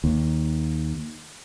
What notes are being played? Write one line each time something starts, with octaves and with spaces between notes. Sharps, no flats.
D#2